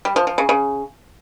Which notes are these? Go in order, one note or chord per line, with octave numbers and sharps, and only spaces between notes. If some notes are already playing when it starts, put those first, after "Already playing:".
G3
F3
F3
C#3
C#3